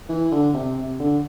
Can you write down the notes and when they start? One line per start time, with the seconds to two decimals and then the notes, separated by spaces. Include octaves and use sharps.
0.09 E3
0.32 D3
0.53 C3
0.77 C3
0.99 D3